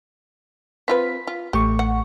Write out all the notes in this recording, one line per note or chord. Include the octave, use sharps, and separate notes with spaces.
C4 F4 B4 B6
F4
A1 A3 G4 C#6
F#5